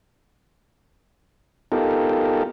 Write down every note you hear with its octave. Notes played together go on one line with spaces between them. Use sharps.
B3 D#4 F4 G4 A4 A#4